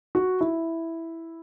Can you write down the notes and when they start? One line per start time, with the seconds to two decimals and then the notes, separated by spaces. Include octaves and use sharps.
0.15 F#4
0.41 E4